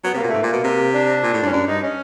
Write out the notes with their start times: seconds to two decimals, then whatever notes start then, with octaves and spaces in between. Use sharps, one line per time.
0.04 F#3 B3
0.14 C3 A#3
0.24 A#2
0.29 A3
0.34 G#2
0.41 A#2 A#3
0.53 B2
0.64 C3
0.93 D4
1.23 A#2
1.33 A2
1.43 G2
1.46 C#4
1.52 F#2 D4
1.67 G2 D#4
1.82 C#4